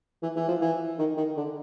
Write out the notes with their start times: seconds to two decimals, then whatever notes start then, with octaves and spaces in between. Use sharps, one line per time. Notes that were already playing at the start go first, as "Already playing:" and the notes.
0.23 E3
0.36 E3
0.48 F3
0.61 E3
0.98 D#3
1.17 D#3
1.37 D3